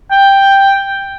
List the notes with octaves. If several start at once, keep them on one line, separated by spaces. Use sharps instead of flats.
G5